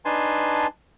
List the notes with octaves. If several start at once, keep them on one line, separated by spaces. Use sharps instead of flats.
D4 D#4 B4 G#5 A5 C6